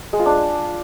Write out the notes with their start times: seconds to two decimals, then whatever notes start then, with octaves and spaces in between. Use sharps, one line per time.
0.13 G#3
0.19 F4
0.26 D4